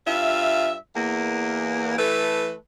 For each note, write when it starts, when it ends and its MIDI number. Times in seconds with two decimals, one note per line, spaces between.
0.06 0.75 43
0.06 0.75 65
0.06 0.75 76
0.95 1.96 40
0.95 1.96 58
1.98 2.54 52
1.98 2.54 57
1.98 2.54 69
1.98 2.54 71